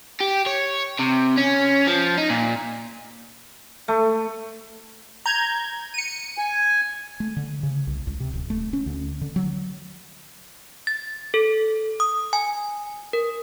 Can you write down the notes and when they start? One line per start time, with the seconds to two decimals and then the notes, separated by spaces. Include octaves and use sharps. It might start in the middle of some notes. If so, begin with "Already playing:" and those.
0.21 G4
0.47 C#5
1.00 C3
1.38 C#4
1.87 F3
2.18 D#4
2.30 A#2
3.88 A3
5.26 A#5 G6 G#6
5.94 C#7 D#7
6.38 G#5
7.20 A3
7.36 D3
7.63 C#3
7.87 C2
8.07 C#2
8.20 C3
8.33 D1
8.50 A3
8.73 C#4
8.86 D2
9.21 D3
9.36 F#3
10.87 A6
11.34 A4
12.00 D#6
12.33 G#5
13.13 A#4